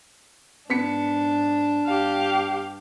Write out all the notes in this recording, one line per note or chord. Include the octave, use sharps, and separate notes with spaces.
G#2 B3 D4 B6 C#7
G2 G4 F5